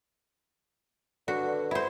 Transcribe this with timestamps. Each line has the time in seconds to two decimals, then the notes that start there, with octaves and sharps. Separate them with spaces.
1.28 D3 F#4 B4 C#5
1.47 B4 D5 C#6
1.71 E4 C5